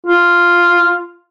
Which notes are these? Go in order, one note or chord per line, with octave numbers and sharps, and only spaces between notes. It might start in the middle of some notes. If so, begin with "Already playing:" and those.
F4